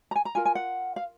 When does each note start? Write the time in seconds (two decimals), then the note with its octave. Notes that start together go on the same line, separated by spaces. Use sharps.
0.11 A#5
0.16 G#5
0.25 A#5
0.35 F4 A#4 G#5
0.45 G#5
0.55 F#5
0.96 F5